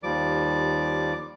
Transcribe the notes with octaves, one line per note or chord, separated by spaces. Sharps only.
D#2 F3 G3 D5 D6